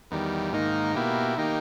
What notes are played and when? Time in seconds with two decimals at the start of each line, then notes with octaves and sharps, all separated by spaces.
0.11 E2 D#3 G3
0.53 G#2 D#3 A#3 D#4
0.95 B2 A#3 E4 G4
1.37 D#3 A#3 D#4 G4